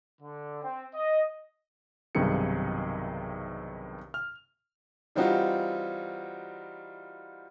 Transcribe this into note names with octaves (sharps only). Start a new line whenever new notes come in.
D3
C4
D#5
B1 G2 C3 D#3 G#4 C#7
F6
E3 G3 C4 D#4 F4 F#4